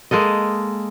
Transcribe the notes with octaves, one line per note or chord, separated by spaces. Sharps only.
G#3 A#3 A4 D#5